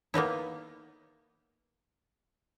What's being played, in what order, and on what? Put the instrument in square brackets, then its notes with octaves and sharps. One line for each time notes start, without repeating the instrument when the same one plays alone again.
[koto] A#3 B3 D#4 E4